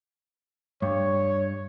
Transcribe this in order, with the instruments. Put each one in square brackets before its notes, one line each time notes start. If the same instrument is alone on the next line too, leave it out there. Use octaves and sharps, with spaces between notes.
[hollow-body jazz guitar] G2 [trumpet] C#5